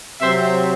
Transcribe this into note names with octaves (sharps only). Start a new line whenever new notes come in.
C3 F#3 C4 C5 E5